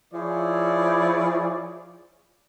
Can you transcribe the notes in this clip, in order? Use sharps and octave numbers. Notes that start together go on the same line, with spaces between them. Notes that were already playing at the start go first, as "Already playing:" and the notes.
F3 E4 F4 G#4 C#5 D5